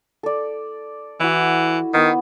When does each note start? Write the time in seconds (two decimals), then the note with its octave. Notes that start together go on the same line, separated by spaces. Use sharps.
0.23 A4 D5
1.20 E3 E4 F#4
1.94 D#3 B3